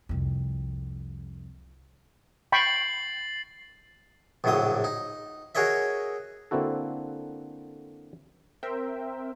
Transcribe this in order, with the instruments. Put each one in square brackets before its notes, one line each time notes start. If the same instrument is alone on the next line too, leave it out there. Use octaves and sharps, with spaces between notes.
[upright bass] C2 F2
[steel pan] G5 B5 C#6 [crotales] A6 C7 F#7
[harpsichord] A#1 F#2 A2 C#3 F#3 D#6
D#4
F#4 G#4 A#4 C#5 D#5 E5
[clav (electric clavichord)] D3 A#3 C4 E4 F#4 A4
[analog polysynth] C4 A#4 C5 E5 G5